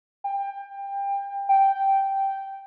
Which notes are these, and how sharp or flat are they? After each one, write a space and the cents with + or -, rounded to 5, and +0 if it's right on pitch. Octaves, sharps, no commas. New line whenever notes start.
G5 +25
G5 -5